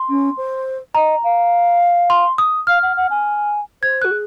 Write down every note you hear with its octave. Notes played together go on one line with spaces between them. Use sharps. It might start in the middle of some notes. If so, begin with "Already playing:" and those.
Already playing: C6
C#4
C5
D#5 A#5
F5
C6
D#6
F5 F6
F#5
F#5
G#5
C5 G#6
F#4 F#6
G#4